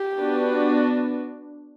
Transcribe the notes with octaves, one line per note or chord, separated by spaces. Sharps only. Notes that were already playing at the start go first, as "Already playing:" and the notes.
Already playing: G4
B3 D4 F#4 B4